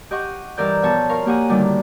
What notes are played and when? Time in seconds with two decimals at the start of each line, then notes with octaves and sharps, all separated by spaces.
0.11 G4 D#5 F#5 C#6
0.57 G2 E3 A#4 D5 G6
0.82 B2 F3 C#5 A5
1.09 A#4 F5 C#6
1.26 A#3 G4 F#5 G#5 D#6
1.49 A2 D3 D#3 G3 F#4